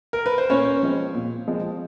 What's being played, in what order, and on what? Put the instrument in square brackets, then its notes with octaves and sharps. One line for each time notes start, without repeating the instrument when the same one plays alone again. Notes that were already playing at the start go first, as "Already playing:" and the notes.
[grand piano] A#4
B4
C5
A#2 C#4 C#5
F3 G#3 C4
A#2
F3 G#3 C4